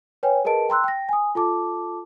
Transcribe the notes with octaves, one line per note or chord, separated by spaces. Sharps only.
B4 C#5 G5 G#5
G#4 A#4 B4 D#5 A5 D7
G5 A#5 C6 E6 F#6
G5 A#6
G#5 D#6
F4 A4 A5 D6